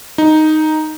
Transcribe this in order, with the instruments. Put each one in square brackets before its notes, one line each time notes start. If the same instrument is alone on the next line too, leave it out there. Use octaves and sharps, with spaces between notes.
[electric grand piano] D#4